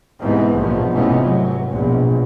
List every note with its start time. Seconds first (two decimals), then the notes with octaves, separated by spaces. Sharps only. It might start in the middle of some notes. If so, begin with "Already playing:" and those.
0.20 G#2 C3 E3 B3
0.56 A#1 D#2 B2 F3 B3
0.91 F1 G#2 C3 E3 B3 C#4
1.22 F#3
1.71 A#1 B2